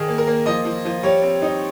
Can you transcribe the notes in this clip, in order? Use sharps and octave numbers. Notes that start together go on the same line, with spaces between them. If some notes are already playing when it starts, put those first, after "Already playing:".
Already playing: D#3 G#4
A#3
A#4
A#3
F3 D#5
F3
F3
G3 C#5
C4
D#4